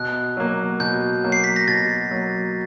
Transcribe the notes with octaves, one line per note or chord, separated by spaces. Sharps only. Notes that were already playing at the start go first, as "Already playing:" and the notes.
Already playing: B2 F#6
F#3 A#3
B2 G6
F#3 A#3
C7
B6
A#6
B2 A6
F#3 A#3